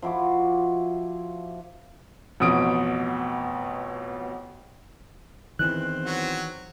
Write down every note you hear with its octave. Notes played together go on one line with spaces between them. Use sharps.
F3 E4 F#4 D6
A1 F2 B2 D#6 D7
E2 D#3 E3 C4 F#6
F#3 F#4